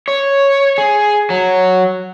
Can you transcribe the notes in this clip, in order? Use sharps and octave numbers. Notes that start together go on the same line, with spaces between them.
C#5
G#4
F#3